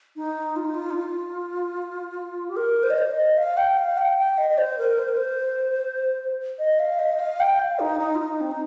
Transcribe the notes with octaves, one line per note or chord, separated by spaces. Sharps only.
D#4
F4
D#4
F4
D#4
F4
G4
A#4
C5
D#5
C5
D#5
F5
G5
F5
G5
G5
D#5
D#5
C5
A#4
C5
A#4
C5
D#5
F5
D#5
F5
G5
F5
D#4
D#4
F4
D#4
C4
D#4